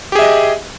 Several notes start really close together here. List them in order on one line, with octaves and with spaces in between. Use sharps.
G4 G#4 E5 D#5